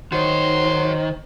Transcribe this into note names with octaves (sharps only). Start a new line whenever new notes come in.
D#3 F#4 C5 C#5 C6